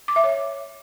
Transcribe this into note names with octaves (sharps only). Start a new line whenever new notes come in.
D6
E5
C#5